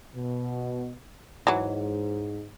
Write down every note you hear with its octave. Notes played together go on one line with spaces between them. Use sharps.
B2
G#2 E3 F#3